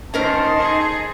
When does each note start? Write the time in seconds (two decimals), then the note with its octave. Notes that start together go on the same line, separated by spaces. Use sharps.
0.14 D#3 C#4 A4 A#4 C5 D#5 A5 C6
0.57 D#4 G#4